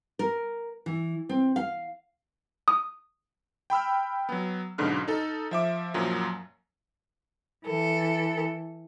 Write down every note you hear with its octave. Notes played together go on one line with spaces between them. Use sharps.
A#4
E3
C4
F5
D#6
G5 B5 E6 F6
F#3 B3
B1 G#2 B2 D3 C#4 F6
D#4 A4
F3 E5 D6
F#2 A#2 F3 F#3
E3 A4